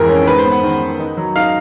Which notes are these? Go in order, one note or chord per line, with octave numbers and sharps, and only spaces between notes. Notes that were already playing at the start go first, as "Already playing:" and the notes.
Already playing: F2 G#2 E3 G#3 A#4
C#4
G#2 B4
C5
B3
F#5
D#3
D#3
D#4
F#3
D#4 F5